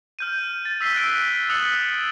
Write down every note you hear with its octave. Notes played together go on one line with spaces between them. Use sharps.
F6 G6 D#7
A6
E6 B6 C7 G7
E6 F#6 A6 D7
D#6 E6 F#6 A6 C#7 F#7